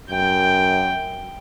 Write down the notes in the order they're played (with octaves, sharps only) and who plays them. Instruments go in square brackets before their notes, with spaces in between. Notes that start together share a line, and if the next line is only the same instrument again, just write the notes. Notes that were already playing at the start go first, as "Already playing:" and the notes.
[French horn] F#2 [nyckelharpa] G5